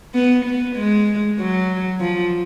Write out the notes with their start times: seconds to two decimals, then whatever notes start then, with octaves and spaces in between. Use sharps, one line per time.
0.14 B3
0.45 B3
0.76 G#3
1.38 F#3
2.00 F3